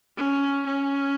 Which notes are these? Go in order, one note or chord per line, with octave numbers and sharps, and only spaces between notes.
C#4
C#4